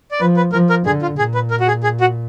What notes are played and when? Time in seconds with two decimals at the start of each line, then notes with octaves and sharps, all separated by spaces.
0.11 D5
0.20 F3 B4
0.37 B4
0.52 F3 A#4
0.70 A#4
0.85 D3 G#4
1.02 F4
1.18 A#2 G#4
1.34 B4
1.51 A#4
1.60 F#4
1.68 G#4
1.83 G#4
2.01 F#4